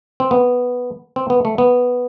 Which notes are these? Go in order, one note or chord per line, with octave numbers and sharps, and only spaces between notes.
C4
B3
C4
B3
A3
B3